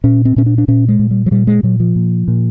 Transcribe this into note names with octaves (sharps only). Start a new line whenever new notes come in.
A#2 C#4
C4
A#2 C#4
D4
D4
A#2 C#4
G#3
A#2
G3
F#3
A#2 G3
G#3
A#2 F#3
F3
A#2
A#2